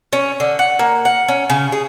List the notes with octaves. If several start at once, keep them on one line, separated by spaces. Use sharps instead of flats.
C#4
D3
F#5
A#3
F#5
C#4
C#3
G#4